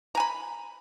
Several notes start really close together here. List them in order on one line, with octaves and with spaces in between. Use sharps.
A#5 G#5 B5